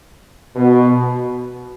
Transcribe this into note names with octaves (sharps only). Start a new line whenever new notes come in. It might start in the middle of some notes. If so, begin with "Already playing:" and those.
B2